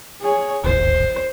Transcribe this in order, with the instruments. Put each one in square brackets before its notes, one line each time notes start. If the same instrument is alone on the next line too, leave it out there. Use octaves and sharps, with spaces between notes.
[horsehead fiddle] G#4 C#5
[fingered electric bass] D1 G#1 D#2 [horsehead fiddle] C5